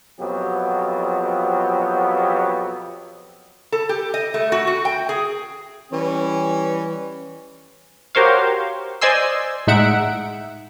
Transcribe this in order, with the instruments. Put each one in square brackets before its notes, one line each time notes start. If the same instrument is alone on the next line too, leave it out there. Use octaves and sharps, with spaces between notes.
[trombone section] F2 B2 F3 F#3 B3 G4
[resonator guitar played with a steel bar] A4
G4
D#5
A3
F#4
F#4
G5
G#4
[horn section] E3 G3 C#4
[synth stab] F#4 G4 A#4 C5 C#5 F5
C5 D5 D#5 G#5 C6 E6
A2 G#3 D#4 E5 F#5 D7